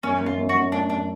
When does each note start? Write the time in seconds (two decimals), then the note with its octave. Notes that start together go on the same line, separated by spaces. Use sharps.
0.03 F#2 C#4
0.21 F#2
0.26 F4
0.38 F#2
0.49 F#4
0.55 F#2
0.72 A3 D4
0.90 F#2 D4